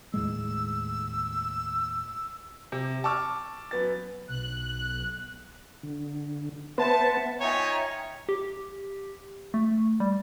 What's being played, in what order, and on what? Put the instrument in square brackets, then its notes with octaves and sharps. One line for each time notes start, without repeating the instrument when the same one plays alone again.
[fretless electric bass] D#2 A2 G#3 [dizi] E6
[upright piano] C3
A5 C#6 D6 E6 F6
F#2 B3 A6
[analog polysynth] B1 F#6
[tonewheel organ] D3
[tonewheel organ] B3 B4 C5 [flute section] E5 F#5 [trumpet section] A5
[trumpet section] D#4 F4 C#5 [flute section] E5 G5 A#5 [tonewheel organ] G#5
[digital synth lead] G4
A3
G3